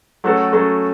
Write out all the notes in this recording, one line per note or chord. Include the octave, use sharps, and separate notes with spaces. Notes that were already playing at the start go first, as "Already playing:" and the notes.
F#3 A3 C#4 F#4 A4
F#3 A3 C#4 F#4 A4